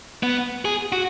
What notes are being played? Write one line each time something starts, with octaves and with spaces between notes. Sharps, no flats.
B3
G#4
F#4